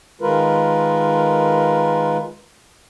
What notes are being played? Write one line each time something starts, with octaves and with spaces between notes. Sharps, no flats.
D#3 G#3 F4 A#4 B4